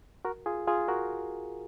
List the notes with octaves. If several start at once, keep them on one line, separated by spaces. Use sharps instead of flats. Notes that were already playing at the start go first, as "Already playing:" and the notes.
F#4 A#4
F4 G#4
F4 G#4
F#4 A#4